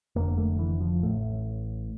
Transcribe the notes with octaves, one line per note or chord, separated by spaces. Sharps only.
F1 F2 D3 A#3
A3
E3
F3
A1 A2 A3